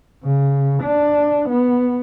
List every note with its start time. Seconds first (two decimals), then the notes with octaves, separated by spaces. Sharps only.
0.24 C#3
0.83 D4
1.49 B3